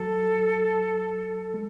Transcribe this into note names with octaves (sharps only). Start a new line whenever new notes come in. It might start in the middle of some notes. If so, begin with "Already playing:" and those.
Already playing: F#3 A4
G#3